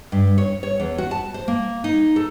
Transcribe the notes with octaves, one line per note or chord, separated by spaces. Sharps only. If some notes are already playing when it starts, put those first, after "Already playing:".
G2
C#5
C#5
E2
F#4
A5
C5
A#3
D#4
A4